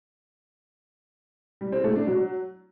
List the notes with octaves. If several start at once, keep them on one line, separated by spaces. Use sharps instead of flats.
G3
C4
A3
D4
F#3